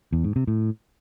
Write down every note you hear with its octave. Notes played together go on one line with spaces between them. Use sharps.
E2
G#2
C3
A2